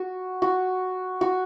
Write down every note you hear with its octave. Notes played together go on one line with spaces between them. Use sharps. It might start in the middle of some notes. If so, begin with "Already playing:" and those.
Already playing: F#4
F#4
F#4